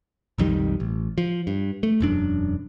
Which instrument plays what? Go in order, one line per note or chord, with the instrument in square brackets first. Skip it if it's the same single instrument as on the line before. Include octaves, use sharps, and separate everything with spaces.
[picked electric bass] B1 F2 D#3 G3
A1
F3
G2
A3
E1 F#2 D4